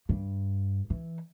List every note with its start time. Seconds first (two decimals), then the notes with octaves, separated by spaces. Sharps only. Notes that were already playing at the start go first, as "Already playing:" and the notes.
0.09 G2
0.90 E3